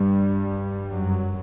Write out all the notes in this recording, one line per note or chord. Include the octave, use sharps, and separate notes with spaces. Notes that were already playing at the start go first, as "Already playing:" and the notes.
Already playing: G2 G3
F#2 F#3